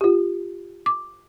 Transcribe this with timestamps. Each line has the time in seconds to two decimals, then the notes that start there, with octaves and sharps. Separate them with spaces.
0.01 F4 G4
0.86 D6